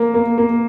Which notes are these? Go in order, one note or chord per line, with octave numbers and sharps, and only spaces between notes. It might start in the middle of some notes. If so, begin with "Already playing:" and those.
Already playing: A#3
A#3
A#3